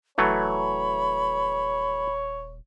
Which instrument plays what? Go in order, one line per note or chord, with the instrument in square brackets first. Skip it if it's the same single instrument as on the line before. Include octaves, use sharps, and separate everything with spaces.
[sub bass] D#1 [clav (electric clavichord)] E3 F#3 A3 [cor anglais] C#5 [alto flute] B5